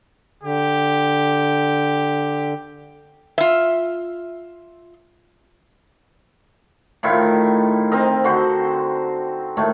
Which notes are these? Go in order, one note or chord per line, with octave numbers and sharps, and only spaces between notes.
D3 G4
F4 E5
A2 D#3 E4 F4
C4 A#4 D#5
D3 F#4 C5
A2 D#3 A3